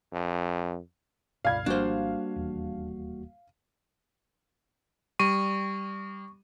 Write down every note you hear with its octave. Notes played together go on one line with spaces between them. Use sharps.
F2
C#2 G2 B2 D5 F5 B5 G#6
G#1 F3 G3 A#3 D4 F#4 C5
D#1 E2
G3 C#6 D#7